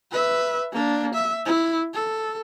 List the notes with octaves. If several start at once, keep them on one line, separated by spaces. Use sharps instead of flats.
B4 E5
A#3 D4
E5
E4
A4